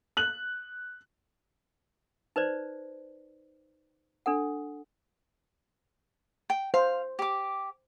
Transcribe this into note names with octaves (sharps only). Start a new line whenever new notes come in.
F#6 F#7
D#4 B4 C5 D5
D4 A4 F#5
G5
C5 F5
G4 D6